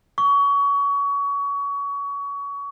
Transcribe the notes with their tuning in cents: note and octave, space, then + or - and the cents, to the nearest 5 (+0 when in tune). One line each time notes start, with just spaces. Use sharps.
C#6 +30